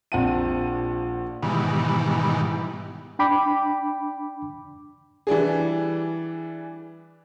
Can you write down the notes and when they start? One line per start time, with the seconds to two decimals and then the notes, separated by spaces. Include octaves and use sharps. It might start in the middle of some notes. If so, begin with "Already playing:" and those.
0.12 A#1 C4 F#5 A5 D#7
1.43 G#2 B2 D#3 E3 G3
3.19 D4 G5 B5 D6
5.27 E3 G3 D4 G#4